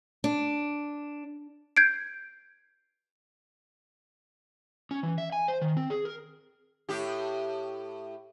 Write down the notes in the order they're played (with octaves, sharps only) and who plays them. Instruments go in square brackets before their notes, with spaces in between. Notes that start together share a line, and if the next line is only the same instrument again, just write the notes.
[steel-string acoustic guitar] D4
[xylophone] G6 G#6 C7 D7
[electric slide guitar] C#4
E3
E5
G#5
C5
D#3
C4
G#4
A#4
[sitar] A2 G4